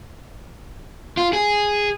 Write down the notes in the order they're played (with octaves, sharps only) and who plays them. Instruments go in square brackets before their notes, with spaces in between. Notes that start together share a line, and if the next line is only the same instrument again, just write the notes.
[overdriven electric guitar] F4
G#4